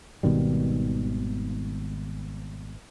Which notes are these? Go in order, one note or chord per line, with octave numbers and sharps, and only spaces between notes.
G#1 B2 D#3 G3